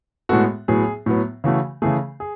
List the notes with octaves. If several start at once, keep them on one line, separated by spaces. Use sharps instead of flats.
A2 G#3 B3 F#4 A4
A2 F#3 B3 G#4
A2 F#3 B3
C#3 E3 A3 F#4
C#3 E3 A3 G#4
G#4